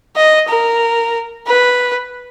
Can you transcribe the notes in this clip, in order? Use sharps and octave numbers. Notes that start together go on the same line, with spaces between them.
D#5
A#4
B4